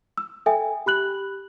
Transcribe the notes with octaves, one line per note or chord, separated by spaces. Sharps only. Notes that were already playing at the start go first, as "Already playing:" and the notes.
E6
A4 E5 G5 G#5
G4 B5 F#6 F#7